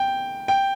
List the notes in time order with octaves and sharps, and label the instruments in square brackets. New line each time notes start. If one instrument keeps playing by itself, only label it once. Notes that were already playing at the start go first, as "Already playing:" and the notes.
Already playing: [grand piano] G5
G5